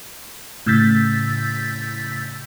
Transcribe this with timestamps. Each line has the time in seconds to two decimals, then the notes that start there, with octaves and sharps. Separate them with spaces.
0.66 A2 C#3 E6 G6 A6 B6